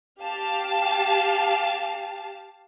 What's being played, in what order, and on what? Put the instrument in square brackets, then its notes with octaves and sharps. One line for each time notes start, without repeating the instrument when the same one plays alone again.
[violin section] G4 F5 A5